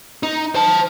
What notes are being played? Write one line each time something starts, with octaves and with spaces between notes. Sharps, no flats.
D#4
C5 A5